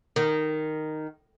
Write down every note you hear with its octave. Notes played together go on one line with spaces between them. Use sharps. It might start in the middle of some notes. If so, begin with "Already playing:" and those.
D#3